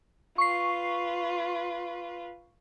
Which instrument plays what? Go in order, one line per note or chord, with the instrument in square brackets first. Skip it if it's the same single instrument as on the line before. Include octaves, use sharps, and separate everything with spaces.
[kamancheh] F4 B4 [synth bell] C#6 C7